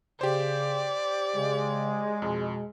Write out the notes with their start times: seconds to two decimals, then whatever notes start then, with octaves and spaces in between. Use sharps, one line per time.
0.21 C#3 G4 C5 D5
1.35 C#3 G#3
2.22 F2 B2